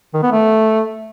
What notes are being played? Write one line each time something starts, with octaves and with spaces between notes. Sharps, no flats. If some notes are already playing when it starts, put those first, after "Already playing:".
D#3
B3
A3